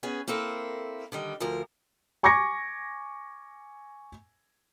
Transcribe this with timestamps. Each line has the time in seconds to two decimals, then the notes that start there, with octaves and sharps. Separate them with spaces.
0.03 B3 C#4 G#4
0.28 A#3 C4 E4 A4 A#4
1.12 D3 D#3 G3
1.40 D2 F3 A#4
2.23 G#5 C#6 D6 G#6 A#6 C#7